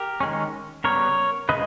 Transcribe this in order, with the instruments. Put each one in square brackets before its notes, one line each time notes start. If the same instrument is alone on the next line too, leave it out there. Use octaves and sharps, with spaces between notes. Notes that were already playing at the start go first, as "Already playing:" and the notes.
Already playing: [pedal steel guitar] G4 A#4
D#3 G#3 C#4
C#3 G3 B3 A#4 C#5
C#3 G#3 B4 D#5